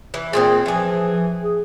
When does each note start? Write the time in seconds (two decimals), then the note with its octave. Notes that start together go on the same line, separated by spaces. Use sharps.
0.14 E3
0.33 A#2 B3 C4 G#4
0.66 E3 F3 G#4
1.43 G#4